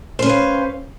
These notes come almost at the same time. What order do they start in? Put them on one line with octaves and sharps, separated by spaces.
C5 C#4 B4 F5